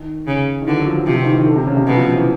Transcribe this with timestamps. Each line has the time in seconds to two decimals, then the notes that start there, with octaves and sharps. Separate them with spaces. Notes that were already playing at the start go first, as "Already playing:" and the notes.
Already playing: D#3
0.27 C#3
0.62 D#3
0.67 D3 E3
0.77 F#3
0.87 F3
0.97 F#3
1.06 C3 F3
1.16 F3
1.22 D#3
1.27 E3
1.37 D#3
1.46 D3
1.56 C3
1.67 C#3
1.77 C3
1.87 B2 F#3
1.96 F3
2.06 F3
2.16 E3